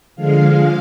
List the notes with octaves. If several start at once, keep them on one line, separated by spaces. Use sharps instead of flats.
D3 F3 G#3 F5